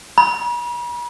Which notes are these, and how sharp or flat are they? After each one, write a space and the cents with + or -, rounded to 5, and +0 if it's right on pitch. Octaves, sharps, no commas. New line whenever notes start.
B5 -45